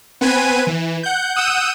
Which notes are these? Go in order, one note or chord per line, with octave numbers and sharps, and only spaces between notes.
B3 C4 B4 G#5 D#7
E3
F#5 G6
F#5 D#6 E6 G6 D#7